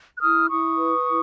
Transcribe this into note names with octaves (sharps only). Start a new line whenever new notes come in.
F#6
E4 D#6 F6
E4 C#6 D#6
B4
E4